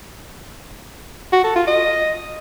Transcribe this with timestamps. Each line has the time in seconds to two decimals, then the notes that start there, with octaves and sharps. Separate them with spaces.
1.32 F#4
1.44 A4
1.55 F4
1.67 D#5